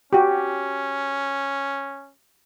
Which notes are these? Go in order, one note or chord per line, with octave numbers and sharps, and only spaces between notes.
C#4 F#4 G4